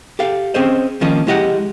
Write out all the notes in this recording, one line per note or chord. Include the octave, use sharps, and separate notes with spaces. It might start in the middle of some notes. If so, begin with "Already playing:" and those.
G4 A4 F5
C4 C#4 G#4 C5 D#5
D#3 F3 A#3 C#4 D#5
G#3 E4 G4 D#5 E5 F#5